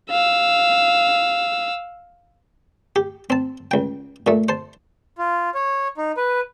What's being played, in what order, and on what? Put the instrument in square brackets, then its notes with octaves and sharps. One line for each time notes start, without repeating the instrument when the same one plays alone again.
[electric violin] F5 E6
[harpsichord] G4
C4 A5
C#2 G5
A#2 A3
C5 A5
[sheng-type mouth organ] F4
C#5
D#4
B4